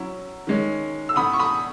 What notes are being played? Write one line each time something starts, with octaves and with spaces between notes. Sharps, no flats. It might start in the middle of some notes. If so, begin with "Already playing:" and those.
Already playing: F#3 C#4 E4
D#3 G#3 C#4
E6
A2 E3 B3 B5 D#6
C#6
B5 D#6